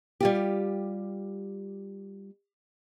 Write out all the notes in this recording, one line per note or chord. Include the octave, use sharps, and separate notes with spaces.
G3 F4 G4